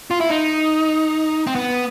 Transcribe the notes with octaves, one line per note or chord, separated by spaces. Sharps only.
F4
E4
D#4
C4
B3